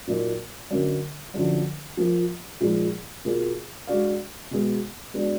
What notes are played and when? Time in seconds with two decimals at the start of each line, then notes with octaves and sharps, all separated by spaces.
0.07 A#2 F#3 A#3 D#4
0.71 F#2 D3 F#3 A#3
1.34 F#2 D3 F3
1.97 F3 A#3 F4
2.60 A#2 F3 G#3 D#4 G#4
3.25 B2 A#3 F4 G#4
3.87 G#3 D4 F#4 D5 F5
4.51 B2 G#3 B3
5.14 G#3 B3 D4 F#4